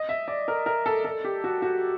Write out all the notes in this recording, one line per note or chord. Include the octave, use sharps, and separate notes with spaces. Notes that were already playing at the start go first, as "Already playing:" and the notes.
Already playing: D#5
E5
D5
A#4
A#4
A4
A4
G4
F#4
F#4